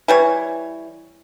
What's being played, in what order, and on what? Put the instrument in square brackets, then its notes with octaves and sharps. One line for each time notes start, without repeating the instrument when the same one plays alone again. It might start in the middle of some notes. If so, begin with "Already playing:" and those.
[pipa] E3 G3 C#5